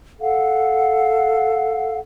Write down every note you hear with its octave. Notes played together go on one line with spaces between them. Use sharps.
A4 F5 F#5